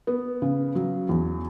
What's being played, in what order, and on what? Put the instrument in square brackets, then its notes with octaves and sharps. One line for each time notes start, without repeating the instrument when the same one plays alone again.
[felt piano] B3
C#3
F#3
E2